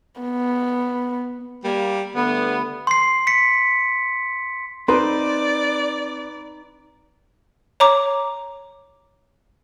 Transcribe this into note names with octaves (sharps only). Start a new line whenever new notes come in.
B3
G3 A#3
D3 G3 A3 B3
C6 C7
B6 C#7
C4 D#4 B4 D5 C6
C#5 A#5 D6